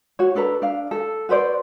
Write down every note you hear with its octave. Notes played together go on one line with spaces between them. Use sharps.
F#4 C#5
D4 A4 B4 A#5
D4 F5
A4
F#4 B4 C5 D5